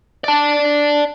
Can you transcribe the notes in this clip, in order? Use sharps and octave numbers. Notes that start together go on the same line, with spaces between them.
D5 A5